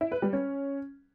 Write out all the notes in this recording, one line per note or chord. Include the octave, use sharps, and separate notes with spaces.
E4
B4
G3
C#4